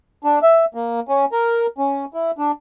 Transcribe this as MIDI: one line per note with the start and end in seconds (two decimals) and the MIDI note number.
0.24 0.39 62
0.43 0.65 76
0.75 1.00 58
1.09 1.25 61
1.32 1.67 70
1.78 2.05 61
2.14 2.31 64
2.38 2.52 62